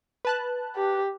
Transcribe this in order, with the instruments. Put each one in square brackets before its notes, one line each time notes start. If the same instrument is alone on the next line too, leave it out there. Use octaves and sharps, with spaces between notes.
[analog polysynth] B4 A5 F#6
[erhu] G4